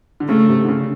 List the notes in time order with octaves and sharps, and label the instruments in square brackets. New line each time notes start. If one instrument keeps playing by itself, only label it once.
[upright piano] D3
[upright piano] C#3 [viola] A3
[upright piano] C3
D3
C#3